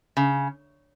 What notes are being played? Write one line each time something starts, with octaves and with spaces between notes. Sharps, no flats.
C#3